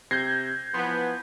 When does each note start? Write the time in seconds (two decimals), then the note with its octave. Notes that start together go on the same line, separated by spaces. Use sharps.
0.11 C3 G6 G#6 A#6 C7
0.74 E3 F3 B3 C6